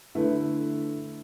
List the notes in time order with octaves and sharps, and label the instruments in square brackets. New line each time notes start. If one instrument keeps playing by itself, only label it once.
[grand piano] D3 A3 E4 B4